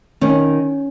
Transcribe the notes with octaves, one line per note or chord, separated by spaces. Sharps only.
D#3 C#4